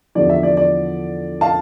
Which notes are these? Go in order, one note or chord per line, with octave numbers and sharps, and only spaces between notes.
E2 D3 F3 D5
E5
D5
D5
F5 A5